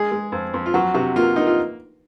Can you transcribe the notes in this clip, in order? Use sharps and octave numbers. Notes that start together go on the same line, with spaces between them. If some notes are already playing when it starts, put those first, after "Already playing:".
Already playing: G#3 G#4
G#3
F2
F2
F4
F#3 F#4
C3 F#4
A#3 F4
A#3 D#4
F4